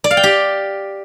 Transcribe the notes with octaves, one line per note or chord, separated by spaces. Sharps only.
D5
F5
G5
G4